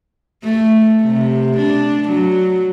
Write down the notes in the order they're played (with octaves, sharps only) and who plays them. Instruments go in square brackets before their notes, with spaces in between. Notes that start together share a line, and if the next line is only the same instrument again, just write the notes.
[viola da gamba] A3
C3
D4
F#3